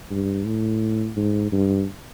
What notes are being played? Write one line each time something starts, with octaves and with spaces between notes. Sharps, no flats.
G2
A2
G#2
G2